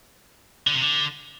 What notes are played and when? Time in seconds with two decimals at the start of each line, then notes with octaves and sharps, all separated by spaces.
0.67 D3
0.74 C3
0.81 D3